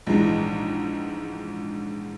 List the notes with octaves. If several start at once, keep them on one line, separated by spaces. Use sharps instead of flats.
A#1 G#2 E3 G#3